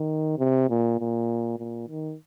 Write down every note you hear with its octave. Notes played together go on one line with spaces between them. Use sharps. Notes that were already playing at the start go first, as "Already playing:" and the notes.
Already playing: D#3
C3
A#2
A#2
A#2
D#3